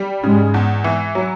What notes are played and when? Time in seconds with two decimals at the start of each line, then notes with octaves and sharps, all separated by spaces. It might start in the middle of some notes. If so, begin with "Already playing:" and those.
Already playing: G3
0.23 G#2 C#3 G#3
0.54 E2
0.84 E3
1.15 F#3